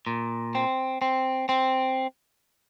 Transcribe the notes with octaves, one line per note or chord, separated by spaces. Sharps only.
A#2
C4
C4
C4